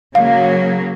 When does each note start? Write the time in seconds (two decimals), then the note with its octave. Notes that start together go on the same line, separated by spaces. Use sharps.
0.15 C#3 F#3 A#3 F5